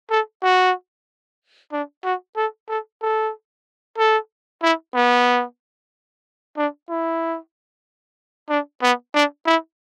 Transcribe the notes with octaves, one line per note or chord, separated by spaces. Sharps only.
A4
F#4
D4
F#4
A4
A4
A4
A4
E4
B3
D4
E4
D4
B3
D4
E4